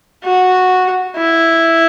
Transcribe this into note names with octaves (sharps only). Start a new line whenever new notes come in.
F#4
E4